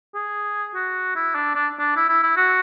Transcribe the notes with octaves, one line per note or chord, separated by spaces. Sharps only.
G#4
F#4
E4
D4
D4
D4
E4
E4
E4
F#4